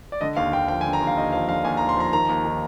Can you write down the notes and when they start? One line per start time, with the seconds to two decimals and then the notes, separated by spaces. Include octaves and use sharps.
0.12 D5
0.21 D3 D#5
0.36 D#2 F5
0.53 D#2 G5
0.68 F3 G5
0.81 G#5
0.85 D3
0.93 A#5
1.01 D#2
1.07 F5
1.17 D#2 D#5
1.32 F3 F5
1.49 D3 F5
1.65 D#2 G#5
1.77 A#5
1.81 D#2
1.89 C6
1.97 F3 A#5
2.12 D#3 A#5
2.29 D#2
2.45 D#3